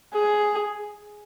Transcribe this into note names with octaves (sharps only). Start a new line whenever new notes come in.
G#4